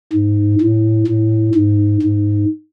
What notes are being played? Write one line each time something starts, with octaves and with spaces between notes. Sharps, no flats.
G#2
A2
A2
G#2
G#2